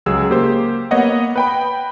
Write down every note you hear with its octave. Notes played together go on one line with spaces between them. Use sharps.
C#2 F#3 G#4 E6
A#3 G4 C5
A#3 B3 C#5 D#5 F#5
B4 G5 B5